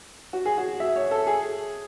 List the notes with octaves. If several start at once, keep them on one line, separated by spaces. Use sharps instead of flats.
F#4
G#4
F#4
E5
C#5
A4
G#4